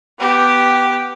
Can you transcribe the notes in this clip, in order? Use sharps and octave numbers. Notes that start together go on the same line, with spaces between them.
B3 G4